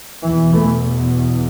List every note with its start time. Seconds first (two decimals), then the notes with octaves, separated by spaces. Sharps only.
0.23 E2 B2 E3
0.53 E3 A3